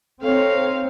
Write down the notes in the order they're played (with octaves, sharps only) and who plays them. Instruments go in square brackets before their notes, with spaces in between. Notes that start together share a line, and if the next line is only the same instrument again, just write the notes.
[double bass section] C4 [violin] D#4 F5 [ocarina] A4 [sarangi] C#5